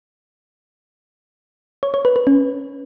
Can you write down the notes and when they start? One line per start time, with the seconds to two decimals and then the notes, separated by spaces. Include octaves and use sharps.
1.83 C#5
1.94 C#5
2.05 B4
2.16 B4
2.27 C#4